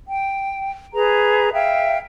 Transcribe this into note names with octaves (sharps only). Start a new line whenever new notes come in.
G5
G#4 B4 A#5
E5 F5 G5